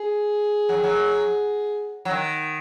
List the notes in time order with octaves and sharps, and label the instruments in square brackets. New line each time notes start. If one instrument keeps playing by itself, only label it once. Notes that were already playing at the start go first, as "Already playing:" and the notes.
Already playing: [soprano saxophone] G#4
[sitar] F#3
D#3
F#3
F#3
D#3